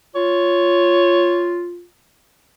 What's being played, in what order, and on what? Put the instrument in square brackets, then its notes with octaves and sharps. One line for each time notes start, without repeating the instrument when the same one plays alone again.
[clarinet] F4 [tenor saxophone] C#5